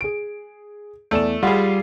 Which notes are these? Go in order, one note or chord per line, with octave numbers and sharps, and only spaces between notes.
G#4 D7
E2 A3 D5 E7
G3 F4 G#4 F#5 B5